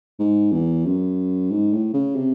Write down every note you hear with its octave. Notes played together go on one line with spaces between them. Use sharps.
G#2
E2
F#2
G#2
A2
C#3
C3